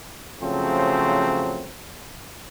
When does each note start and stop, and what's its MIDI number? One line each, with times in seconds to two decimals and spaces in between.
0.42 1.70 49
0.42 1.70 53
0.42 1.70 54
0.42 1.70 57
0.42 1.70 60